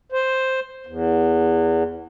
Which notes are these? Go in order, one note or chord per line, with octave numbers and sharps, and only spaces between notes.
C5
E2